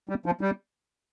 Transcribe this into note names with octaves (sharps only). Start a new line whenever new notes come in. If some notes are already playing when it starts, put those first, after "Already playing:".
G3
F3
G3